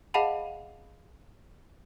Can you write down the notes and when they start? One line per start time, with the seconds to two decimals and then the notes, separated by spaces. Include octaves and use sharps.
0.14 G#4 D#5 F5 F#5 A5 B5